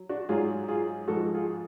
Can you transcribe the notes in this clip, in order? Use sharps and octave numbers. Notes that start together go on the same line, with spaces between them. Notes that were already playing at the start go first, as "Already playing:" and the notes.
Already playing: F#3
D4 F#4
G#2 F#3 F4 G#4
F4 G#4
G#2 F3 G#3 F#4 A4
F4 G#4